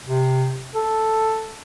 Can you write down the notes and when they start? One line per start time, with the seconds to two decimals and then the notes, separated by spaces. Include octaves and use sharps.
0.06 C3
0.75 A4